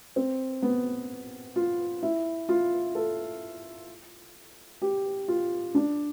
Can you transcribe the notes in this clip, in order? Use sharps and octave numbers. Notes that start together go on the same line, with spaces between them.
C4
B3
F4
E4
F4
A4
G4
F4
D4